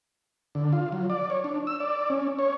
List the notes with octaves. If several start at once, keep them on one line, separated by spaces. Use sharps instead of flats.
D3
F4
F#3
D5
C#5
D4
E6
D5
C#4
C#5